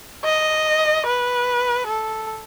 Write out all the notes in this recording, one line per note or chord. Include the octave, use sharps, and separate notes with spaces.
D#5
B4
A4